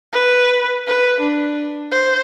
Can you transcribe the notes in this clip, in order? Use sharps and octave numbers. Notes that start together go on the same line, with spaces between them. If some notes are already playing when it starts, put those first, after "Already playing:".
B4
B4
D4
C5